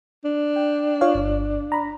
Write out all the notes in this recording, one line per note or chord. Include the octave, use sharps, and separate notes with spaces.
D4
G5
F4 C#5 F5
G1
A#5 B5